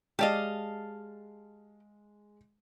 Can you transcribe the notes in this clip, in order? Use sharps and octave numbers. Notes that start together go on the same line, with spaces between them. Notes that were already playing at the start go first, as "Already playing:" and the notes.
G#3 G4 D5 D#5 F5 A5